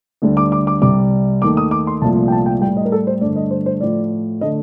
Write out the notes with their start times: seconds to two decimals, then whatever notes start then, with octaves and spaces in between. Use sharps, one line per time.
0.22 D2 D3 G3
0.37 D6
0.52 D6
0.67 D6
0.82 C2 C3 G3 D6
1.42 D#2 D#3 A3 D6
1.57 D#6
1.71 D6
1.87 C6
2.02 C2 A#2 F3 A3 A5
2.28 G5
2.32 A5
2.46 G5
2.61 G3 G5
2.66 A2
2.77 D#5
2.85 A#4
2.92 A4
3.07 C5
3.21 G2 D3 A3 D5
3.36 D#5
3.51 C5
3.66 C5
3.81 A2 F3 A3 D5
4.41 D3 A3 D#5